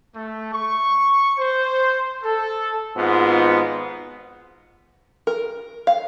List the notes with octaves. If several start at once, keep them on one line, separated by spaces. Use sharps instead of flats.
A3
C#6
C5
A4
G#1 G#2 B3 F4
A#4
F5